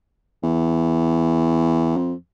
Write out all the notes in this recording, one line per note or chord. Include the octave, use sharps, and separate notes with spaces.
E2
F2